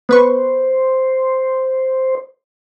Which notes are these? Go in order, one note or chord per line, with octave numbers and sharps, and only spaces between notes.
B3 B4 C5 C#6